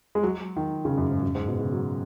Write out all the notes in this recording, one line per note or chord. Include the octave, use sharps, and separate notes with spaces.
G#3
F#3
D#3
C#3
F#2
G#2
F#2
G#2
B2
C#3
F#3